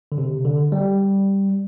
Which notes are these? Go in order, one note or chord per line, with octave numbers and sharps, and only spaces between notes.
D3
C3
D3
G3